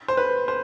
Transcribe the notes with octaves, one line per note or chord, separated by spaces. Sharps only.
C5
B4
C5